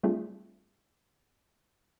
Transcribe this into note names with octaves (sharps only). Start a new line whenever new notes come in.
G3 A3 C4 D4 F4 G#4